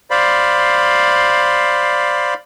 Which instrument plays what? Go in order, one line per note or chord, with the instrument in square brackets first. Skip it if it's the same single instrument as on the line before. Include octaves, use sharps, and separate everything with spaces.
[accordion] C5 D5 F5 B5